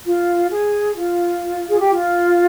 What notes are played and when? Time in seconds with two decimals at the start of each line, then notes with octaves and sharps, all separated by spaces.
0.06 F4
0.51 G#4
0.97 F4
1.70 G#4
1.80 G4
1.89 F4